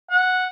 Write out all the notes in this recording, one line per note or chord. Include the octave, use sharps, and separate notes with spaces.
F#5